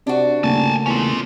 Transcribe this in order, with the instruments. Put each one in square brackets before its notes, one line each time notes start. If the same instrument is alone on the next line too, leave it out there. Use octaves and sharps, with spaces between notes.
[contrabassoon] C3 [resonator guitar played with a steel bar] D4 F#4
[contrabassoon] D#1 [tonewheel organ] C#3 A3 A#3 [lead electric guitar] G#5 A5
[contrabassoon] E2 [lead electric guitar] C#4 F4